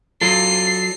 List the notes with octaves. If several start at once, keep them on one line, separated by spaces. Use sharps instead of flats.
F#3 F4 A4 C7